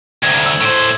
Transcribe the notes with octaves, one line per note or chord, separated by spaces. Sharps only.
D2 C3 G#6
E6
A2 C5 E6